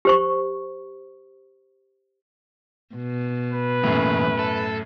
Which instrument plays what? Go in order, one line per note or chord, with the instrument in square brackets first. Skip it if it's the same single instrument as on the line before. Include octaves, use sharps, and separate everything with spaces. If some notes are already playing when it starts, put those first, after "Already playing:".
[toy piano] G4 C5 C#6
[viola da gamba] B2
[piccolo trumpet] B4
[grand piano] F#2 A2 [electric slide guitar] E3 A#3
[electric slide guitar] A4